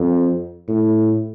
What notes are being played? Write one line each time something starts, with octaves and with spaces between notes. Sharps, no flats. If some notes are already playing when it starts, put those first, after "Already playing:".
Already playing: F2
A2